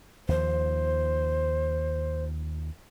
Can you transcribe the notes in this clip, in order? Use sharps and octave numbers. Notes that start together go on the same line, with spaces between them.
D#2 F3 C5